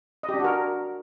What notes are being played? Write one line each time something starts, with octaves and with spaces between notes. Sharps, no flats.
D#5
G4
D4
F#4
A#4